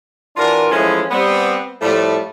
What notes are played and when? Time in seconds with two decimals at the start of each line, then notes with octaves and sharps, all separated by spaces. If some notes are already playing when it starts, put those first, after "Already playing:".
0.37 E3 D4 F4 F#4 A#4
0.71 E3 F3 G#3 A3 C#4 E4
1.11 G3 B3 C4
1.82 A2 F3 G3 A3